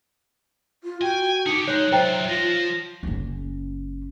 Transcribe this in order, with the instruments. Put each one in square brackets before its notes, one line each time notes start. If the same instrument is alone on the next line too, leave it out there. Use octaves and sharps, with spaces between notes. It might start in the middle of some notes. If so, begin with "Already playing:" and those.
[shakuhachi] F4
[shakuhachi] F#4 [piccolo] G5 [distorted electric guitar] G#5
[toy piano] D#4 D6 [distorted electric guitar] G4 G#4 [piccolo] C#7
[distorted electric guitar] G#3 [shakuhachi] D#4 [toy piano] C#5 [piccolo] F#6
[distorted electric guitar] F#3 F4 [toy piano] C5 G5 A#5 [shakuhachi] E5
[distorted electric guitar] F3 [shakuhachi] F4 [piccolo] A#6
[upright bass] F#1 C#4